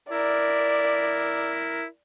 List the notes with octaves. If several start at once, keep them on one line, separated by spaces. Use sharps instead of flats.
E4 A#4 D5